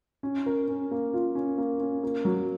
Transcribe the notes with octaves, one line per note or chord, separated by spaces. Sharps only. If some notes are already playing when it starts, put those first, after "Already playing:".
C#4
A#4
C#4
A#3
F4
C#4
A#3
C#4
A#3
F#3